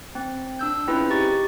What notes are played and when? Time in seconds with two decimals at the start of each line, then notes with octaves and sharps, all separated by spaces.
0.15 C4
0.59 D4 E6 G6
0.88 C4 C#4 E4 F4 G#4 B4
1.10 D#4 G4 C#6 A6